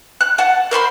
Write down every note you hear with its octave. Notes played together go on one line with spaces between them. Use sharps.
F#6
F#5 A5
A#4 C5 B5 C6